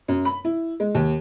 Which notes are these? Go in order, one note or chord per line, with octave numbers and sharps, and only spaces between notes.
F#2
B5
E4
G#3
D#2